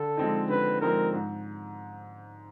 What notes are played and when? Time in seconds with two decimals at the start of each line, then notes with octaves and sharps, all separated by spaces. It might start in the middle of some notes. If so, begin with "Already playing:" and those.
Already playing: D3 A4
0.17 F3 G#3 C4 D#4
0.49 D3 B4
0.81 F3 G#3 C4 D#4 A#4
1.13 G#2